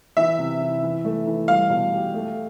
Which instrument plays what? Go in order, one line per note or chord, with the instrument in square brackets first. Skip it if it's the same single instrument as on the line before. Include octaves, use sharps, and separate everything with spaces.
[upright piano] E3 [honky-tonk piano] E5
[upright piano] C3
E4
E3
A3
E3
[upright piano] G3 [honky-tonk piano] F5
[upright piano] B2
G4
A3